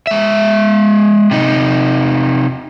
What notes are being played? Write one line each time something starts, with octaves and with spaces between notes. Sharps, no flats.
G#3 E5
C3 D#4